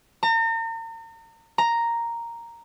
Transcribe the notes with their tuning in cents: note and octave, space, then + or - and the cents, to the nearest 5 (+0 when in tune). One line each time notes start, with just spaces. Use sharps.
A#5 -40
A#5 +0